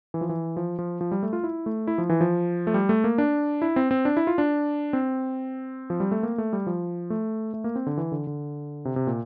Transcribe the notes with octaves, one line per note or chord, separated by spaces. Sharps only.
E3
F3
E3
F3
F3
F3
G3
A3
F4
E4
A3
E4
F3
E3
F3
A3
G3
A3
A#3
D4
E4
C4
C4
D4
E4
F4
D4
C4
F3
G3
A3
A#3
A3
G3
F3
A3
A3
A#3
C4
D3
E3
D3
D3
C3
C3
A#2